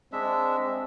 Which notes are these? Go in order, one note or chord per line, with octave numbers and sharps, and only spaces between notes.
G#3 C4 D4 E5